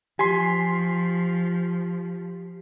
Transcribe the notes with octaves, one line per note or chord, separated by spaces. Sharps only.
F3 G4 G#5 C6 B6 C7